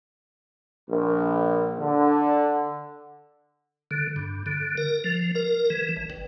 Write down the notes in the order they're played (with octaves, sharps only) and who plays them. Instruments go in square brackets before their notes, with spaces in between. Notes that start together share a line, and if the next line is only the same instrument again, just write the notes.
[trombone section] A#1
D3
[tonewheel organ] D3
G2
D3
A#4
F3
A#4
E3
A1
G1